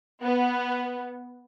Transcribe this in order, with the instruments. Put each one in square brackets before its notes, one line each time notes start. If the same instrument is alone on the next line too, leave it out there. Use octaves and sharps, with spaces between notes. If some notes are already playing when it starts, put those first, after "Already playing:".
[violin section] B3